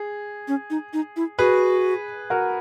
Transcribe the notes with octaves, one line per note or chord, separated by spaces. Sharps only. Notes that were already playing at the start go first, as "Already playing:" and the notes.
Already playing: G#4
C#4
D#4
D#4
E4
F#4 G#4 B4
F#4 A#4